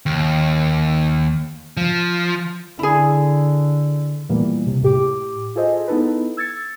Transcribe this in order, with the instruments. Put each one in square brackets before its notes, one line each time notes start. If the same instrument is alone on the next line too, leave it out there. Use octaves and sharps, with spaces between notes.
[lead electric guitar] D#2
F3
[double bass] D3 [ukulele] E4 G#4
[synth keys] A#2 E3 G3 A#3 B3
C3
A2 G4 D6
F4 G#4 A4 C5 D#5
B3 D#4 E4 A4 B4
E6 G#6 A6 C#7